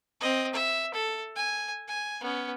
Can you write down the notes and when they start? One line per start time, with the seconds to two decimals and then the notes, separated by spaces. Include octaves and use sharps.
0.21 C4 D#5
0.54 E5
0.94 A4
1.36 G#5
1.88 G#5
2.21 B3 C#4